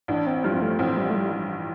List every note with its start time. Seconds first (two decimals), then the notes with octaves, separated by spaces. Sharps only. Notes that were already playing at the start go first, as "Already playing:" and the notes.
0.08 A1 D4
0.27 C4
0.44 G2 F3 G3
0.54 C4
0.62 A3
0.79 A1 C4
0.97 G3
1.10 A3
1.15 G3